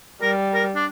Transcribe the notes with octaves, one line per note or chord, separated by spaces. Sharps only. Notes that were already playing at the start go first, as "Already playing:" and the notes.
G3 A#4
A#4
D4